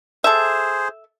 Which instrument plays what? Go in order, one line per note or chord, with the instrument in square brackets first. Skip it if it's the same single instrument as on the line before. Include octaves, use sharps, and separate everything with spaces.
[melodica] G#4 C5 [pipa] A4 E5